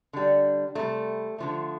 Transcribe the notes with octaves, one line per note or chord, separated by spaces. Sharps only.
D3 G3
C3 G3 A3
D3 F3 A3